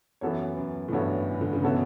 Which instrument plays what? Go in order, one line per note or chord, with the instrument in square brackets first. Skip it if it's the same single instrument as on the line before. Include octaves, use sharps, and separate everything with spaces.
[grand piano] F#2 [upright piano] E3 B3 F#4 A4 C#5
[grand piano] F#2
A2
[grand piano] G2 [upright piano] E3 B3 F#4 A4 C#5
[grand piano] E3
D3
C#3
[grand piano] B2 [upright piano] E3 B3 F#4 A4 C#5